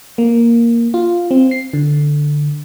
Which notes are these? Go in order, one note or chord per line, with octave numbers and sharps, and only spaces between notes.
A#3
F4
C4
C7
D3